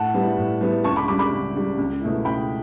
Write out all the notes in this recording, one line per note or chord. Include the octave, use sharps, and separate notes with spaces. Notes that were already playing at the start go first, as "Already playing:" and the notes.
Already playing: A2 F#5 A5
G3 B3 E4
A2
G3 B3 E4
C#2 A5 C#6
B5 D6
C#3 G3 B5 D6
B5 D6
C#2
C#3 G3
C#2
B2 A3 E4
C#2 G5 B5